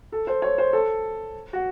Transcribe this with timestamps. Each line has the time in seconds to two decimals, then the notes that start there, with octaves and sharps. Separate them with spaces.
0.12 A4
0.27 C5
0.42 C#5
0.58 C5
0.73 A4
1.53 F#4